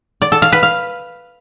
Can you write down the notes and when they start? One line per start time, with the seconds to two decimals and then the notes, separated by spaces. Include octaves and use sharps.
0.22 D5
0.32 A4
0.42 F5
0.52 B4
0.63 F5